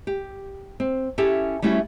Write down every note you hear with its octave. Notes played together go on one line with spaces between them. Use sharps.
G4
C4
C#4 E4 G4 A4
G3 A3 C#4 E4 F#4